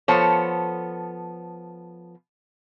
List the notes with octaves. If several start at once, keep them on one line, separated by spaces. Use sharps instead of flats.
F3 B3 A4 C5 C#5